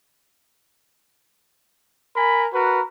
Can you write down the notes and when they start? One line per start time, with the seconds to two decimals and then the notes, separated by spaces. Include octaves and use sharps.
2.15 A#4 G#5 B5
2.53 F#4 A#4 B4